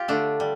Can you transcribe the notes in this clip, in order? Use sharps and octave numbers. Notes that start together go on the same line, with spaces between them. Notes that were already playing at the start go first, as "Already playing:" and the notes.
Already playing: F4 G4
D3 A3 D4
G3